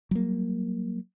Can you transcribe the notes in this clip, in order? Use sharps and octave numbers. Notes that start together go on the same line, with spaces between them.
F#3 G3 A#3